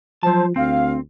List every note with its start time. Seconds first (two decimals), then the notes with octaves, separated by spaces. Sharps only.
0.23 F3 F#3 C5 A5
0.56 D2 C4 F5